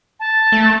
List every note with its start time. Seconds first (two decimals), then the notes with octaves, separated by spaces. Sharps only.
0.19 A5
0.52 A3